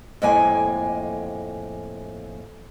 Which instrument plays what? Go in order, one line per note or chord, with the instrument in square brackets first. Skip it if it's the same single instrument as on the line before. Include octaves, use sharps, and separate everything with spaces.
[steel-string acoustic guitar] F2 A2 G#3 A#3 G5 G#5